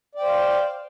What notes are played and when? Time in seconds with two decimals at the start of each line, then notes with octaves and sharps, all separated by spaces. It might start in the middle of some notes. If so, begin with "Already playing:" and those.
0.15 D5
0.19 G5
0.22 C5
0.26 F5